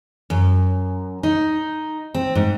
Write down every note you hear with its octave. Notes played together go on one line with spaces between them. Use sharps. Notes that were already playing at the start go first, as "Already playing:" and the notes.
F#2
D#4
C4
G#2